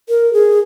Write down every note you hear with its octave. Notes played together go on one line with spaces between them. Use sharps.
A#4
G#4